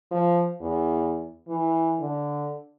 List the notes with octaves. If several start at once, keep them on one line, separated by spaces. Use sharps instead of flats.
F3
E2
E3
D3